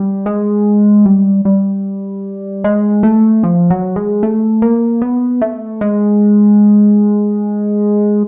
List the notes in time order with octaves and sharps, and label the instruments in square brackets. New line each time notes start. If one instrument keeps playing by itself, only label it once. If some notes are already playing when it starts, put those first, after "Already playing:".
Already playing: [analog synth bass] G3
G#3
G3
G3
G#3
A3
F3
F#3
G#3
A3
A#3
B3
A3
G#3